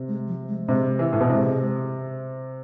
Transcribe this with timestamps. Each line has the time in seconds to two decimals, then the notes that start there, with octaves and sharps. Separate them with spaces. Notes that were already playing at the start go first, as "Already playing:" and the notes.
Already playing: C3
0.08 G#3
0.28 F3
0.49 G#3
0.68 C3 G#3
0.99 E3
1.13 A2
1.21 B2
1.29 C3 G#3